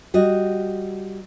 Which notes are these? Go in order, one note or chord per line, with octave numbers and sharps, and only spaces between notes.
G3 F#4 D#5